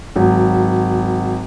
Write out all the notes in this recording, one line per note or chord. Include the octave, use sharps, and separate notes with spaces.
G#1 F#3